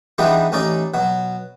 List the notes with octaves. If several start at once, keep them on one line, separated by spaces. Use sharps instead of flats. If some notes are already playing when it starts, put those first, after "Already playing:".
E3 G3 G#3 B3 D4 D#4
A1 C#4 D#4 D5
B2 F#3